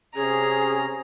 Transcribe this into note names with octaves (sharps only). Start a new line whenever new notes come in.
C3 C#4 G#4 A#5